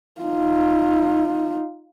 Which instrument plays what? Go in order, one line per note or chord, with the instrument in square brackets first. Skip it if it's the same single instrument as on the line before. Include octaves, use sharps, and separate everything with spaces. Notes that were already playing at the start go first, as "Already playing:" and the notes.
[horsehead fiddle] D#4 F4